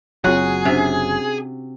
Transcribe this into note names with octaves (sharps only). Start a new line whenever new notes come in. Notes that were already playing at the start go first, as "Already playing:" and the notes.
F#1 C#2 F#3 C4 F4 F#4 G#4 C#5
C3 C#4 D4 C5